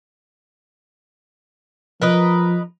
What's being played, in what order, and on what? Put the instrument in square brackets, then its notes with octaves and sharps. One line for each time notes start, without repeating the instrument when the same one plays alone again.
[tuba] F3 [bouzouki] A#4 B4 D#5